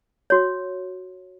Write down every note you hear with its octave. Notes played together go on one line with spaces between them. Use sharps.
F#4 C#5